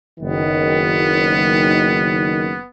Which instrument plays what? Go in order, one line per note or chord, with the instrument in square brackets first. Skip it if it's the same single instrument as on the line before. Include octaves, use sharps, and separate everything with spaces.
[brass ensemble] F#1 D#3 [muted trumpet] B3